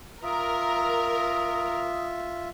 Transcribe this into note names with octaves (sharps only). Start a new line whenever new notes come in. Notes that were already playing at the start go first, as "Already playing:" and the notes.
F4 A#4 E5 D#6